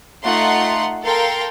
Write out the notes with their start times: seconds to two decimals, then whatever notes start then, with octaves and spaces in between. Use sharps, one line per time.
0.23 A3 D#4 F4 F#5 C6
1.02 A4 A#4 F5 G5 C6